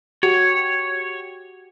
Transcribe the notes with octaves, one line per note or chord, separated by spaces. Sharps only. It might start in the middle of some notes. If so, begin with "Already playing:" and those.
F#4 G4 C#5